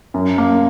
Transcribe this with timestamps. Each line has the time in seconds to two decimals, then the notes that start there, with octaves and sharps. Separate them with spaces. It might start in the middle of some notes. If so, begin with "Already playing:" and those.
0.14 F#2
0.38 A#3